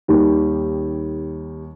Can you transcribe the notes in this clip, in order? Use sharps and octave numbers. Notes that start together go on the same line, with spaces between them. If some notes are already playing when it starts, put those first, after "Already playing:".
D#2 D#3 G3